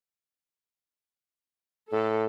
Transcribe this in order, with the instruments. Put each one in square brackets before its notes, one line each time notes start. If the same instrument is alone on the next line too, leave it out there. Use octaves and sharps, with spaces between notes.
[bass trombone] A2 [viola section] A4